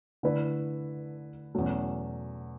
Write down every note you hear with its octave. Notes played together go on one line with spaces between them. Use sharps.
D3 A3 E4 B4 D5
E2 B2 F#3 A3 C#4